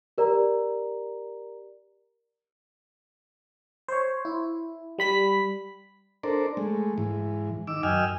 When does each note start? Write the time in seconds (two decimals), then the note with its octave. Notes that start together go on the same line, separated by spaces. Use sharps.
0.18 G4 A#4 D5 A#5
3.88 C5 C#5
4.25 E4
4.99 G3 B5 B6
6.23 D4 A4 A#4 C5 D5
6.57 G#3 A3
6.98 G#2 E3
7.67 D#3 D6 E6
7.83 F#2 D#5 G5 G#5 E6 F6